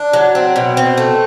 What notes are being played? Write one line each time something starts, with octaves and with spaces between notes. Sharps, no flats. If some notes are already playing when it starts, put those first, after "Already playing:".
Already playing: D4
F#3
C4
B2
C4
A3